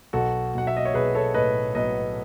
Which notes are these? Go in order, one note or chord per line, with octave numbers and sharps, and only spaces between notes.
B1 F#4 A4
B1 F#5
E5
D#5
C#5
B1 G#4 B4
A4 C#5
A2 B4 D#5
B1 B4 D#5